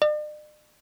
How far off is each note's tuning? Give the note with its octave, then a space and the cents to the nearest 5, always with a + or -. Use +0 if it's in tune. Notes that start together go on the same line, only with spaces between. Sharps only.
D5 +45